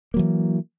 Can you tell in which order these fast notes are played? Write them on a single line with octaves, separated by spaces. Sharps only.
A#3 F#3 E3